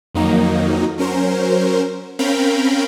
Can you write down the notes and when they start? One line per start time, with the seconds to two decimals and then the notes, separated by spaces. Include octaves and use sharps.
0.14 F2 D#3 F#3 A#3 D#4
0.98 F#3 C#4 A#4 C5
2.19 C4 C#4 A#4 F5 G5 B5